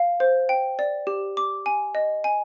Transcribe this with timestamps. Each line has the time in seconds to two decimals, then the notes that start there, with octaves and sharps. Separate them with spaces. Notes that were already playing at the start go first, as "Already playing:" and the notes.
Already playing: F5
0.20 C5
0.49 G5
0.79 D5
1.07 G4
1.37 D6
1.66 G#5
1.95 D#5
2.24 G#5